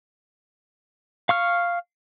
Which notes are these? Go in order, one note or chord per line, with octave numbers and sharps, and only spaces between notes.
F5 C#6 F6